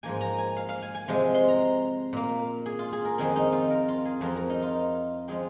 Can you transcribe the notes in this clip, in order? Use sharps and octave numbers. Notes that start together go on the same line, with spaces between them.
G#2 F3 A#3 G#5
A#5
G#5
F5
F5
G#5
G#5
C3 F3 G#3
C6
A#5
A#2 A#3
G#4
F4
G#4
A#4
F2 D#3 C4 G#4
D#4
F4
A#4
F4
G#4
F2 F3 C4 A#4
A#4
D#4
F4
F3 G#3 C4 G#4